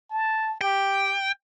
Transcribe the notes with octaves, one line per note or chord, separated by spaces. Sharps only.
A5
G4 G5